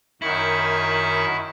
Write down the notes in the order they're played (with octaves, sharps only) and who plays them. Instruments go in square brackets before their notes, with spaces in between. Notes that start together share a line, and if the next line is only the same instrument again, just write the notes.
[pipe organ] F#2 D#3 C#6 [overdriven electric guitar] E4